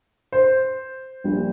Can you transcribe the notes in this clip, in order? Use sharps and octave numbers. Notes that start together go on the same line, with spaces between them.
C5
A#1 A#2 G3